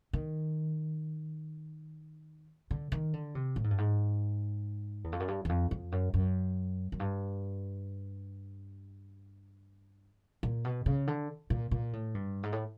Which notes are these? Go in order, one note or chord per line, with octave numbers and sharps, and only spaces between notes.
D#3
D3
D#3
D3
C3
A2
G#2
G2
G#2
E2
F2
F#2
G2
E2
F2
F2
F#2
F#2
F#2
G2
A#2
B2
C#3
D3
A#2
A#2
A2
G2
G#2
A2